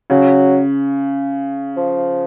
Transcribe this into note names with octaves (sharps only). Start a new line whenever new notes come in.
C#3 F#3
F3